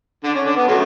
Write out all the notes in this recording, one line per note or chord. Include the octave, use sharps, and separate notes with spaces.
D3 D4
C#4
D3 D4
B3
C#3 F#3 A3